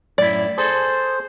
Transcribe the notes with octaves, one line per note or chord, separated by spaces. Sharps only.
F#2 A2 E4 D5
G#4 A4 C5